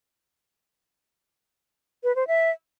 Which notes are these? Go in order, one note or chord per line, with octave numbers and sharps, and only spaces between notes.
B4
C5
E5